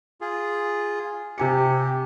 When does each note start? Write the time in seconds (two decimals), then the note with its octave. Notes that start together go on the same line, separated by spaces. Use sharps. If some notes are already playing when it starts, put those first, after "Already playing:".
0.21 F4 G#4
1.38 C3 G4 G#5 C#7